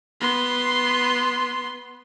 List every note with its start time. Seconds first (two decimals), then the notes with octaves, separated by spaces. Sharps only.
0.21 B3 C6